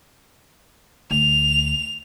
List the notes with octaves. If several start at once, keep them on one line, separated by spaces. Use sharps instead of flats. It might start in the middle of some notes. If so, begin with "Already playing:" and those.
D2 F7